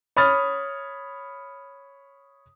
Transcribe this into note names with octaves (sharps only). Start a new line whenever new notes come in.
C#5 B5 D#6 F6 A6